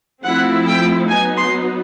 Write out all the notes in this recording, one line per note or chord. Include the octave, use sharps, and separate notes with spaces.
F3 A3 C4 E4 F#5
G5
F#3 B3 D#4 G#5
C6